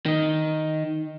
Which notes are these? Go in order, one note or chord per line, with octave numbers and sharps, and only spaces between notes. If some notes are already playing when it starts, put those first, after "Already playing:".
D#3 D#4